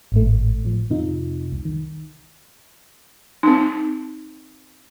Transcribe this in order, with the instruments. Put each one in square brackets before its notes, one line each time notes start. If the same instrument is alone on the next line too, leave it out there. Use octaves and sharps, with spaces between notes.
[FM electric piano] G#1 A2 A3
A2 F3
F2 C3 D#4 F4
C2
D#3
[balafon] C4 D#4